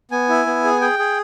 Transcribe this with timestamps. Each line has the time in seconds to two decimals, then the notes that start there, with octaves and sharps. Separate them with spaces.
0.11 B3 G#5
0.29 E4
0.47 B3
0.64 G#4
0.81 G#4 G5
0.99 G#4